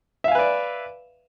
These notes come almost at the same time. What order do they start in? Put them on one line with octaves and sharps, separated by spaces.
E5 F5 G#5 B4 D5